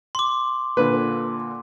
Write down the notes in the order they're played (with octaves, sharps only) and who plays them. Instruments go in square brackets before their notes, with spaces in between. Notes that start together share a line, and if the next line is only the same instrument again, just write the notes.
[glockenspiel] C6 D6
[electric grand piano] A#2 D3 A#3 [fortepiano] B4